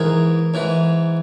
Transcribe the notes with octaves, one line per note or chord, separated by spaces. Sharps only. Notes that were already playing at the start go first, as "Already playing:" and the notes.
Already playing: G#2 E3 G#4 A#4
G#2 E3